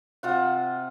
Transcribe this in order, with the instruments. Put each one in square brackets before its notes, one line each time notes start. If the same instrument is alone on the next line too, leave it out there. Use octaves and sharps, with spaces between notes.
[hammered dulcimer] C3 F4 F#5